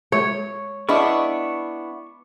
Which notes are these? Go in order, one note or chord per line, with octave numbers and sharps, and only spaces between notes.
G#3 C#5
B3 D4 E4 G#4 D#5 B5 C#6